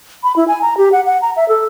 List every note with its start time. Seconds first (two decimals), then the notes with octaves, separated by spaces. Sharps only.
0.23 B5
0.36 E4
0.48 G#5
0.62 A#5
0.77 G4
0.92 F#5
1.06 F#5
1.22 A#5
1.36 E5
1.49 A4